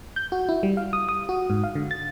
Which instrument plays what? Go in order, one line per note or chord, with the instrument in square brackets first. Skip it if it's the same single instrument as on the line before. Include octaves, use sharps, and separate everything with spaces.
[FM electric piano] G6
F#4
E4
G3
F5
D#6
D#6
F#4
G#2
F5
D3
A6